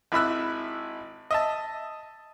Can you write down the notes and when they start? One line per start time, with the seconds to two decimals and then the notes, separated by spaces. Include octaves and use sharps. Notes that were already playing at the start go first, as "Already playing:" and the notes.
0.12 G#1 E4 B5 E6 F#6
1.31 D#5 E5 A5